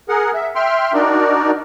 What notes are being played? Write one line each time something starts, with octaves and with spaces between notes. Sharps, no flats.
G#4 A#4 F#5
E5
E5 G5 C6 F6
D4 D#4 F#4 A#4 D5